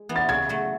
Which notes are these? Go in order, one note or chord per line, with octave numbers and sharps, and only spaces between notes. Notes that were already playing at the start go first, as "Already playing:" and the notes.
Already playing: G#3
E3 B3
A6
C#3 G#6
F#3 A3